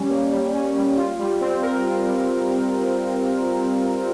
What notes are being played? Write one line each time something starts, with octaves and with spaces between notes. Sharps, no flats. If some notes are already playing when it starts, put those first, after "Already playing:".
Already playing: G3 C#4
A#3
G3
C#4
G3
F4
G3
C4
A#4
F4
G3